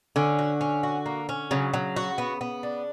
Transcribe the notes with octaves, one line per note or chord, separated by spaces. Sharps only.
D3 C#4
F#4
C#4
F#4
A#3
C#4
C#3 F#3
F#3
F#4
B3
B3
D4